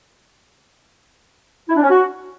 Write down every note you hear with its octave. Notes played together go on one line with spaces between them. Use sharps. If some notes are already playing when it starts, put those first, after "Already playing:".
E4
D4
C#4
F#4